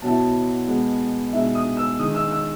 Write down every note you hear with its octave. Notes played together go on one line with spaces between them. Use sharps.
B2 F#3 B3 E4 A5
B2 G#3 B3
B2 G#3 D#4 E5
D#6
E6
D#3 G#3 D#4 D#6
E6
E6